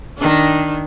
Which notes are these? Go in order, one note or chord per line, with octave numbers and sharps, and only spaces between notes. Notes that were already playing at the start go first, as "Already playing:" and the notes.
D#3 D4